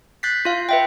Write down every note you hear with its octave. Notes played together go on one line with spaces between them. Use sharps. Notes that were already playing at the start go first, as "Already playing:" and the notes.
F#6 G6 A6 B6 C7
F4 F5
B4 E5 G5